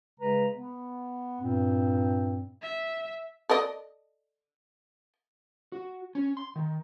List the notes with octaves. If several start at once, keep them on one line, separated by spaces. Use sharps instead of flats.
C#3 G#3 B4 A#5
B3
G2 A#2 C4
E5
A4 D5 D#5
F#4
C#4
C6
D#3